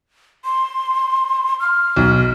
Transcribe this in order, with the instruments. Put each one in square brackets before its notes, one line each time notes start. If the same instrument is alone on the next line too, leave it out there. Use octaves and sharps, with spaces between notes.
[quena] C6
F6
[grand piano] B1